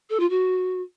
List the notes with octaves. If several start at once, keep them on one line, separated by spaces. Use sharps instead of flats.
A4
F4
F#4